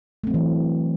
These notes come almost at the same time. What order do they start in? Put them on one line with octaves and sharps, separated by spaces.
A3 C4 F#3 E3